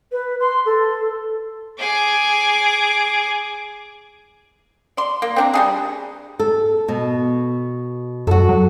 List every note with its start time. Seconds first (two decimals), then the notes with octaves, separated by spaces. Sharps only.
0.12 B4
0.40 C6
0.66 A4
1.79 G#4 D6
4.97 D5 C6
5.22 A#3
5.36 C4 D4 A#5
5.54 G3 D#4 G#4
6.39 A4
6.88 B2
8.27 F#2 F#4 A4
8.49 F#3